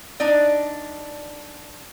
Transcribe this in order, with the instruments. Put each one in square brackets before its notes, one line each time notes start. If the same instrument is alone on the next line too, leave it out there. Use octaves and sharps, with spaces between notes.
[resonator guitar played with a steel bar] D4 D#4 D5